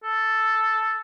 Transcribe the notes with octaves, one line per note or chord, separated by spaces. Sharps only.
A4